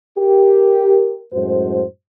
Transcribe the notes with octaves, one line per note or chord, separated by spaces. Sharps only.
G4 A#4
F#2 A2 G#3 F#4 C5